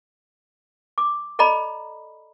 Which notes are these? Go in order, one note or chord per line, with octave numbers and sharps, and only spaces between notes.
D6
A4 D5 D#5 A#5 B5